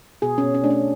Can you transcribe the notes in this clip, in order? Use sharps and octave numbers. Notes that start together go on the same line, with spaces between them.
B2 G#4
C#4
B2
C#4
A3 D4
C#4